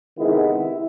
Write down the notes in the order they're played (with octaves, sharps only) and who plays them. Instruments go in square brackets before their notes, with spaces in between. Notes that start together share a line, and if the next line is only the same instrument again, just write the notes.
[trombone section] C3 D#3 G#3 B3 E4